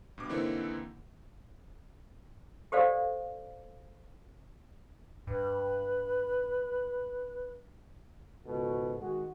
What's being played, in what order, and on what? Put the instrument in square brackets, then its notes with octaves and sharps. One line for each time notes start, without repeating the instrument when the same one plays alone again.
[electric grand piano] G2 B2 D6
D3 E3 A#3 C4 D#4 E4
[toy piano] G4 A4 C5 D5 F5
[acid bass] G2 [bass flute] B4
[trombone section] C#2 G#2 B2 F#4 A4
D#3 G#3 F#4